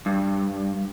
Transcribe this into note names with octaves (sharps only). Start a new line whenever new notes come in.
G2